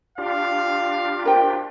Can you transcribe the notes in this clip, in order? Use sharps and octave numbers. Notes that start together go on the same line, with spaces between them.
D4 F4 G4 F5
A#4 C5 G5